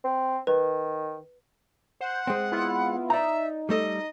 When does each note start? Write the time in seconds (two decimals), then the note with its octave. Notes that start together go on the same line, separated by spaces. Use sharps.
0.04 C4
0.47 D#3 B4
2.01 C5 F#5
2.27 G#3 C4
2.52 B3 E4 F4
3.10 D#4 D5 E5 A#5
3.69 G3 A3 A4 D#5